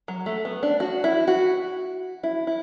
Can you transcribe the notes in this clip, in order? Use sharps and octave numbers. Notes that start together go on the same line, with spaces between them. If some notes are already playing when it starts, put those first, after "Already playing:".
F#3
A3
B3
D4
F#4
E4
F#4
E4
E4